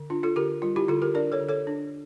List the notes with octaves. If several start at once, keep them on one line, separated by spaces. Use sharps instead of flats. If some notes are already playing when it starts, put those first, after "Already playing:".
Already playing: D3
D4 F4
F4 A4
D3 G4 A#4
G3 F4
E4 G4
D3 F4 A4
G4 A#4
D4 A#4 D5
A4 C#5
D3
A4 C#5
D4